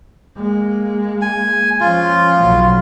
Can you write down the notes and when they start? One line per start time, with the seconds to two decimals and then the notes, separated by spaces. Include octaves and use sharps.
0.37 G#3 A#3
1.22 G#5
1.81 F3 C#4 F4
2.41 B1 F#3